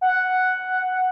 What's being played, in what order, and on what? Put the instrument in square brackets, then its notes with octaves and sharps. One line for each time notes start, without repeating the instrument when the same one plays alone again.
[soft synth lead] F#5